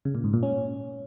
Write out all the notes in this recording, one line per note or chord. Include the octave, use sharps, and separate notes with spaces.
C#3
A#2
G#2
A#2
C#4